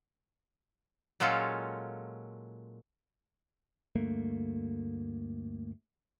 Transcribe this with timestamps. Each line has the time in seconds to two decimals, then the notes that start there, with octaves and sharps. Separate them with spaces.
1.20 A#2 F#3 G#3 C#4 F4 A4
3.95 D2 G2 A3 A#3